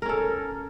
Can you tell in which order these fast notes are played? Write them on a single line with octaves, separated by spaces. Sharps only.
A#4 C#4 A4